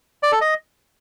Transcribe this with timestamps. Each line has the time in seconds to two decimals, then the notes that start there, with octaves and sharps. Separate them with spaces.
0.23 D5
0.32 A4
0.41 D#5